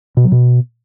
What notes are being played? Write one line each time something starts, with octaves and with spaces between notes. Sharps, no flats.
B2
F#3
B2